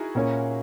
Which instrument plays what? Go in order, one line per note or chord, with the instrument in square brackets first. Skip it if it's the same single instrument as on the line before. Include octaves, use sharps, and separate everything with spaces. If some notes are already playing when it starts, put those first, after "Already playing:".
Already playing: [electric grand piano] D#4 E4 F#4 G#4 A#4
[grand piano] A#2 A#3 C#4